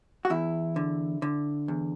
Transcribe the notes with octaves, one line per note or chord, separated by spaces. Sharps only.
F#4
E2 E4
D3
D3
E2